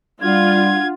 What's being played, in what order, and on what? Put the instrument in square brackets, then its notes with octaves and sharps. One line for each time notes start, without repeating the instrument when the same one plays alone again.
[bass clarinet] G3 [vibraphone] D4 F#5 [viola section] F4 [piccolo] G#6